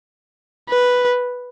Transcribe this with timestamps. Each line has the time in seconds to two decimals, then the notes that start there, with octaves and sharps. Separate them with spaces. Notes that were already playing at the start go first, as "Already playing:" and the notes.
0.70 B4